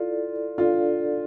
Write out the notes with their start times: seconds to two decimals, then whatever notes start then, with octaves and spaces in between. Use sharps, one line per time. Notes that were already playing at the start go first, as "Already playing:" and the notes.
Already playing: E4 F4 A4 D5
0.58 D4 F4 A4 D5 F5